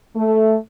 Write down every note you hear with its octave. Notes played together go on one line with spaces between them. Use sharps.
A3